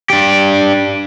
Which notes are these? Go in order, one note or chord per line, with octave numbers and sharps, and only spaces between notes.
D4 G4